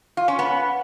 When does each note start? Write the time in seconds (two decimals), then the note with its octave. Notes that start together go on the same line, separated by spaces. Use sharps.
0.17 F4
0.28 C#4
0.39 B3